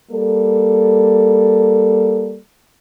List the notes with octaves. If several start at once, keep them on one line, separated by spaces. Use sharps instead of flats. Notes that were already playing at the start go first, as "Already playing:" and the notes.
G3 A#3 A4